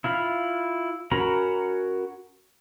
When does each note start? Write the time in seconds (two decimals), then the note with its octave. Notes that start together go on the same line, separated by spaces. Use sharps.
0.04 E4 F4 F5 B5
1.11 C#4 F#4 A#4 A#5 B5